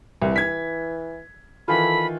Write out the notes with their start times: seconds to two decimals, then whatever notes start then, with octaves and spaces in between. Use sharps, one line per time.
0.22 C2 E3
0.36 G#6 B6
1.68 D#3 E3 F4 A4 B5